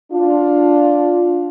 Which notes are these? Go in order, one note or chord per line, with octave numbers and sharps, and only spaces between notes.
D4 F4